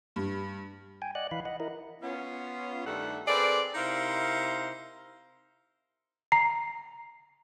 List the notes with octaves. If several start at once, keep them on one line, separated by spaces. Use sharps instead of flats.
G2
G5 G#5
D5 D#5 F#5 F#6
E3 F5 B5
D#5 F#5
E4 A#4 D#5
B3 C#4 F4
G2 D#3 G3 A3 A4 F#5
C4 G#4 A4 B4 D5
C3 D#4 E4 A#4 C5 F5
A#5 C7